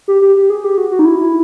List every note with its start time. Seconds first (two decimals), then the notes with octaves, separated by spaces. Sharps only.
0.08 G4
0.22 G4
0.36 G4
0.50 G#4
0.64 G4
0.78 F#4
0.91 F#4
0.99 D#4
1.05 E4
1.19 E4